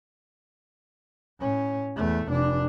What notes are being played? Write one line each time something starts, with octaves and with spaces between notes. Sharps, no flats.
A2 C#4
E2 A3
F1 D4